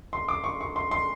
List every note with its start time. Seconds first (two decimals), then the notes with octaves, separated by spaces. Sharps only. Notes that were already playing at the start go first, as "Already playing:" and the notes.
0.13 C6
0.28 D6
0.44 C#6
0.61 C#6
0.76 C6
0.91 C6